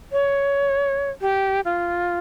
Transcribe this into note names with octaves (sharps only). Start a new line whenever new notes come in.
C#5
G4
F4